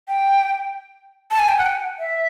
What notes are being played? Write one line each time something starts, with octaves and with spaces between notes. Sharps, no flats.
G5
A5
G#5
G5
F#5
G5
E5